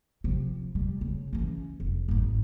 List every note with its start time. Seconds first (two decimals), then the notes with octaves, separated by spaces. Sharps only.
0.24 C3 F3
0.75 G3
1.01 C#3
1.33 E3 C#4
1.80 F1
2.08 G#1 D#4